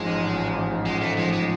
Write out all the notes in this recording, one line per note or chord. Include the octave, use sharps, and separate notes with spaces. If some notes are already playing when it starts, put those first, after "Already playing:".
Already playing: A1 G#2 F3 G#3
A1
G#2 F3
A1 G#3
A3
G#2 F3 G#3
G#3